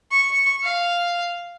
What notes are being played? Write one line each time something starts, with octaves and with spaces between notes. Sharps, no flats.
C#6
F5